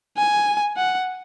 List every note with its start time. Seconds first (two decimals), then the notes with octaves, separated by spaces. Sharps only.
0.18 G#5
0.77 F#5